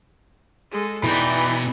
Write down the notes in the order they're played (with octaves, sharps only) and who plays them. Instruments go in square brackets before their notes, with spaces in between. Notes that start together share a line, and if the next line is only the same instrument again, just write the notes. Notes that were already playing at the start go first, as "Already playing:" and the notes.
[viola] G#3 A4
[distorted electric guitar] B2 G5 [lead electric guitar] E3 [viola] D#4 D5